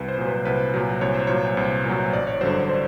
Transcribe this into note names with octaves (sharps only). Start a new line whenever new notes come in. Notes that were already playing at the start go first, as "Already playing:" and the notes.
Already playing: C2 B4
C5
A#2 F#3
B4
C2 B4
A#2 F#3
C2 C#5
C5
A#2 F#3 C#5
C2
A#2 F#3
A1 D5
C#5
G2 D3 F#3 C5
C5
C5